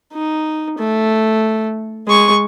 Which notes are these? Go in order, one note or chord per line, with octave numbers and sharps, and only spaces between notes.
D#4
A3
G#3 C#6